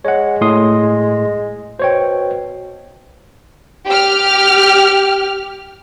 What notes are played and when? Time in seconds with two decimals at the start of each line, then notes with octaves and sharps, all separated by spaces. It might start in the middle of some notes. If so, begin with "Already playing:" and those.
0.05 G#3 C#5 F#5
0.41 A2 C6 D#6
1.79 B2 C5 C#5 G5
3.87 G4 F6